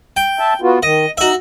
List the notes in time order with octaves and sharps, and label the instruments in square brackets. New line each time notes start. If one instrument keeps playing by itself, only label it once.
[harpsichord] G5
[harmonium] E5 A5
B3 F4 F#4
[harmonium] D#3 [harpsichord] D#5
[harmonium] D#4 [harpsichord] F#4 E5